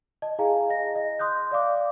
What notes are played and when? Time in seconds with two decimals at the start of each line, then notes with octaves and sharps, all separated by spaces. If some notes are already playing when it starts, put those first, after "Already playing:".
0.22 D#5 A5
0.39 E4 G#4 F5 G#5 A#5
0.70 D#5 A#6
0.96 D#5
1.19 C6 D#6 F#6 G6
1.52 D5 F5 D6